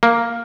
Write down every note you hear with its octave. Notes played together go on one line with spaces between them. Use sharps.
A#3